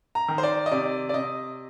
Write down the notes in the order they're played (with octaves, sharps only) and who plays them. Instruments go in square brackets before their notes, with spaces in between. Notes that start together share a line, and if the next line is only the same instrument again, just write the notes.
[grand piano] A#5
D#3
C5
D5
D#5
C3 D5
D5
C3 D#5